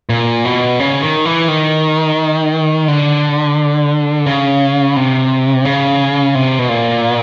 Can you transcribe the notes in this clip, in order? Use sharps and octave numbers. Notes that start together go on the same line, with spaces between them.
A#2
B2
C#3
D#3
E3
D#3
D3
C#3
C3
C#3
C3
B2
A#2